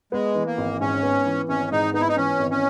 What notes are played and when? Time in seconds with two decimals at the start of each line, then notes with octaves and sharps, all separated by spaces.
0.12 G#3 B3
0.35 E3
0.47 A#3
0.58 G#1
0.80 G#2 C#4
1.03 B3
1.26 E3
1.49 G#1 C#4
1.71 G#2 D#4
1.94 B3 D#4
2.01 E4
2.09 D#4
2.17 E3 C#4
2.39 G#1
2.51 C#4